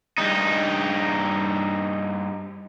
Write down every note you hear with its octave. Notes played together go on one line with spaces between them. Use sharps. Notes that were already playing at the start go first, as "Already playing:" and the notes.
G2 D#4